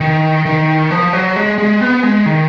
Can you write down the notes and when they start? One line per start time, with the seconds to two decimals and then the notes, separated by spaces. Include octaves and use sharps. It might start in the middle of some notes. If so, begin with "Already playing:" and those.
0.01 D#3
0.46 D#3
0.91 F3
1.13 F#3
1.36 G#3
1.58 G#3
1.81 B3
2.03 G#3
2.26 D#3